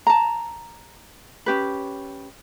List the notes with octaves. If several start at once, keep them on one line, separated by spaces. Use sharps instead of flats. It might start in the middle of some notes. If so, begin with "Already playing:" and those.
A5 A#5
C#4 G4 B4